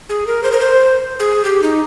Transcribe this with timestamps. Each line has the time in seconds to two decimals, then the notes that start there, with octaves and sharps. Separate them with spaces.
0.09 G#4
0.27 A#4
0.43 C5
0.52 A#4
0.60 C5
1.19 G#4
1.45 G4
1.62 D#4